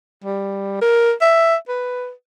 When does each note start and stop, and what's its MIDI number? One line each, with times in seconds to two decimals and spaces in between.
0.24 0.77 55
0.82 1.12 70
1.21 1.55 76
1.69 2.11 71